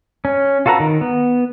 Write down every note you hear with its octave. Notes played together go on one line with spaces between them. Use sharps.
C#4
F4 F#4 A4 B4 A#5
D#3
B3